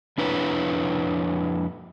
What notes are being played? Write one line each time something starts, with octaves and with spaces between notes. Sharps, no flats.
F2 D4 E4 B4 C#5 A#5